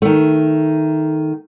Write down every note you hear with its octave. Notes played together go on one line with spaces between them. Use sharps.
D#3 A3